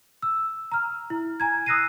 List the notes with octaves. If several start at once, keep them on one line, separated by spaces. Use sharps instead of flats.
E6
A#5 F6
E4
G#5 A#5 G#6
D#6 E6 F#6 A#6 C7 D#7